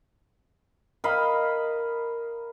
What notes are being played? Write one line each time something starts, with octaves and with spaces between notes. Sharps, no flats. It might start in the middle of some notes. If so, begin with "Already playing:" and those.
A#4 D#5 F5 B5